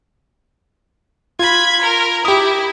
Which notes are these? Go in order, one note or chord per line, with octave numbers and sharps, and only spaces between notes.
F4 B5 G#6
A#4
E4 G4 D#6